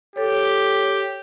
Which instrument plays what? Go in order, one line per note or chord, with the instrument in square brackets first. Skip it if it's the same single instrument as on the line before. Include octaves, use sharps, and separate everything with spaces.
[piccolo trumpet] G4 [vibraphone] A4 C#5